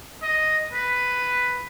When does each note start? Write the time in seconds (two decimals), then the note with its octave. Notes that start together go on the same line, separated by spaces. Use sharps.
0.22 D#5
0.73 B4